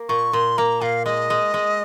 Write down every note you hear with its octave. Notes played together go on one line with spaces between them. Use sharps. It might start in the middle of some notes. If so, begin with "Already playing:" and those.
Already playing: A#3
A#2 C#6
A#2 C6
A#3 A#5
A#2 F5
G#3 D#5
G#3
G#3